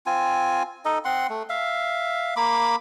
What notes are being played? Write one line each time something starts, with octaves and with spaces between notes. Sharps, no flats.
C4 F4 G#5
D#4 A4 D#5
C4 F#5 C6
A3
E5 F5
A#3 B5 D6